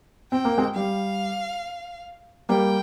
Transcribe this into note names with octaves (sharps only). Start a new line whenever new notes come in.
C4 G5
A#3
G#3 C4
G3 F5
G3 A#3 G5